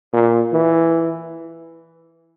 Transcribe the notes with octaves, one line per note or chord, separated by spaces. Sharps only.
A#2
E3